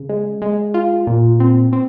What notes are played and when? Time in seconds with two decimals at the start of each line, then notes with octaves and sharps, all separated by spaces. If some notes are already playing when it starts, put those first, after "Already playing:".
Already playing: C#3
0.09 G#3
0.42 G#3
0.74 F4
1.07 A#2
1.40 C4
1.73 C4